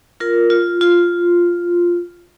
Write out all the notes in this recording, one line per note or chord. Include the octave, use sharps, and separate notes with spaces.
F4 A#4
F4
F4